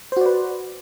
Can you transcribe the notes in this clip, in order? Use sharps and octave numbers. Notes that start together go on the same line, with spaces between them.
F#4 B4 C5 D5